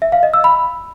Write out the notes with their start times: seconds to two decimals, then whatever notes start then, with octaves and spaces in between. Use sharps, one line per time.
0.02 E5
0.12 F5
0.23 D#5
0.34 E6
0.44 B5